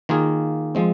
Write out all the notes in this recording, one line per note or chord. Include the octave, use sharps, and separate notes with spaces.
D#3 A#3 F4 G#4
F3 G#3 C4